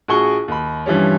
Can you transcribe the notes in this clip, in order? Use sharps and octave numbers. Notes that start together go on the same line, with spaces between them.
A#1 F#4 G#4 C#6 G7
D#2 B5
G2 E3 F3 G3 C#4